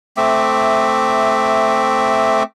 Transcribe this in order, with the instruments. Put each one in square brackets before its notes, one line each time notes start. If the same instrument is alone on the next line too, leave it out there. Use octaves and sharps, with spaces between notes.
[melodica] A3 C4 E5 D6